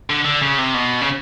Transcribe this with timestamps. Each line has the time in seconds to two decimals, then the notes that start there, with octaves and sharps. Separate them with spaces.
0.10 D3
0.25 D3
0.42 C#3
0.59 C3
0.75 B2
1.01 C#3